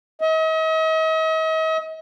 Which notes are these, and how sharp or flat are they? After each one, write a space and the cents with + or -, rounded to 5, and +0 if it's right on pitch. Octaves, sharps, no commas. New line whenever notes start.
D#5 +45